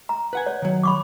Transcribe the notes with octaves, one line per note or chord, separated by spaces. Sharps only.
A#5
B4 F#5 G#5
C#5
D#3 F#3
B5 C#6 D6